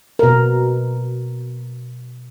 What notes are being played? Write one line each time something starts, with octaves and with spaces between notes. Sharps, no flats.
B2 A#4